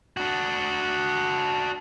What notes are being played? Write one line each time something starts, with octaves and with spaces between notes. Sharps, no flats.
D4 F#4